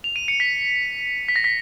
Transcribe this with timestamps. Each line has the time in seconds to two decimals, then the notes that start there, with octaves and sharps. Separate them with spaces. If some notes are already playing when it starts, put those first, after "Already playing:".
0.04 F7
0.16 D#7
0.28 C#7
0.40 B6
1.28 B6
1.36 A#6
1.44 B6